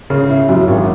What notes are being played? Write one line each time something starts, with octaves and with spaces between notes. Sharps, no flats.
C#3
E4
F#2
G#1